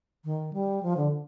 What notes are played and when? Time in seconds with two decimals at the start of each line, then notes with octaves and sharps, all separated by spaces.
0.24 D#3
0.53 G3
0.83 F3
0.97 D3